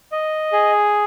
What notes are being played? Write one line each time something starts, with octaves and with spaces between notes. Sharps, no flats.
D#5
G#4